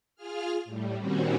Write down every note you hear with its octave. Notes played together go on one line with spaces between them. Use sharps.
F4 G#4 F6
A2 G3
A#2 D#3 G3 C4 C#4 F#4